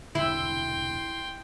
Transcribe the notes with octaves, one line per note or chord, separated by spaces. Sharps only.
E1 C2 D3 E4 G5 C6